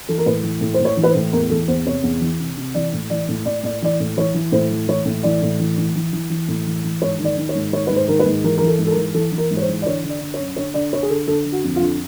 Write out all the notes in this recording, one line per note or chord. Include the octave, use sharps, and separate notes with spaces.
E3 A4
A#4
A2 B4
E3
A2
C5
A2
C#5
E3
B4
C5
A2
E2 A#4
E3 A4
E2 C5
C3 C#5
E2
E3
C3
C3
E3 D5
A2
E3 D5
A2
A2 D5
A2 D5
E3 D5
A2
E3 C#5
E3
A2 C5
E3
E3 C#5
A2
E3 D5
A2
E3
E3
E3
E3
E3
A2
E3
E3
G#2 C#5
D#3
D5
D#3
C#5
G#2
D#3 C#5
G#2 B4
C5
D#3 A#4
B4
G#2
E3 A#4
E3 A#4
A4
G#2
A4
A#4
E3
E3 A4
E3
A#4
G#2
C#5
C5
E3
D5
D3 C#5
D3
D5
D3
C#5
F#2
D3 C#5
D3 D5
D3 C#5
G#4
D3 A4
D3 A4
D3
F#4
F2
F4
D3